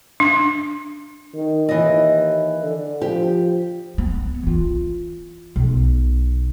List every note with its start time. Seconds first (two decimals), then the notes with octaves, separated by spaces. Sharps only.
0.20 D4
1.34 D#3
1.69 D#2 E3 D#5
2.63 D3
3.02 F3 G4
3.98 B3
4.43 E3 F4
5.56 B1